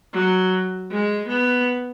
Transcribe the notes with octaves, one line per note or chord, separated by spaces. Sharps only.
F#3
G#3
B3